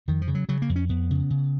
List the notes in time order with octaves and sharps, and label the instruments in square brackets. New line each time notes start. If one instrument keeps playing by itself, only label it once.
[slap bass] F2 D#3
F3
C#3
F#3
C#3 F#3
A#3
F2
C#4
F2 B3
C#3
C#3